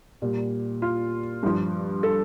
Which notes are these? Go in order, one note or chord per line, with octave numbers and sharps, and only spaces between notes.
A#2 G3
F4
G2 F3
A4